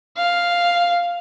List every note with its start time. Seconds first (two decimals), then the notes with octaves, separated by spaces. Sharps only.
0.17 F5